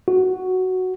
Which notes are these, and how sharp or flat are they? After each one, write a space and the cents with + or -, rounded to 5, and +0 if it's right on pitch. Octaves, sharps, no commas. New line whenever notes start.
F#4 +5